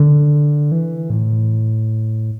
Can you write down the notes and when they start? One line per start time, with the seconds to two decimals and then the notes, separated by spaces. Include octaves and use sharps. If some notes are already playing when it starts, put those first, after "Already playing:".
Already playing: D3
0.72 E3
1.10 A2